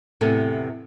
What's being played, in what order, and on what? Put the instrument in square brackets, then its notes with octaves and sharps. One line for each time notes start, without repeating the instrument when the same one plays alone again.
[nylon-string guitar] E2 A2 C3 B3 A4 G#5